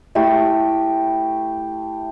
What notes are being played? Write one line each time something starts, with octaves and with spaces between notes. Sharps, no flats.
A3 E4 G4